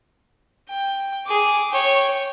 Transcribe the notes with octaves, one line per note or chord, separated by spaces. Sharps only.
G5
G#4 D6
C#5 G5